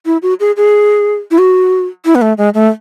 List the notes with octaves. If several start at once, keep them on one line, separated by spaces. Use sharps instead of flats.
E4
F#4
G#4
G#4
E4
F#4
E4
B3
A3
G#3
A3